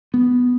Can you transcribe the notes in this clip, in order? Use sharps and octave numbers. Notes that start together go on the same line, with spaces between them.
B3